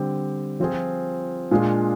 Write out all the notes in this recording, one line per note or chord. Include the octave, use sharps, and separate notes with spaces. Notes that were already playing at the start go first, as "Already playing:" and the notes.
Already playing: D3 G3 C4 G4
F3 C4 F4 G#4
A#2 G#3 D4 F4 G#4